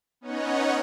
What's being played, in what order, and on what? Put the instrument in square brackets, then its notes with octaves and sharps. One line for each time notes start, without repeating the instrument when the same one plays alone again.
[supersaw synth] B3 C#4 D#4 C#5 D#5 F#5